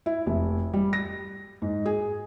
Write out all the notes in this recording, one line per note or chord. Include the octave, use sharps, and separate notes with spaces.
E4
F1
G3
A#6
G#2
G#4